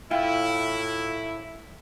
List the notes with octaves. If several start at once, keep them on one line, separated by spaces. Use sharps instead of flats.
A2 E4 F4 G5